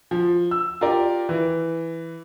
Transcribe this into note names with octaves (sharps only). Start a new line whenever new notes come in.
F3
E6
F4 G4 A#4 D5
E3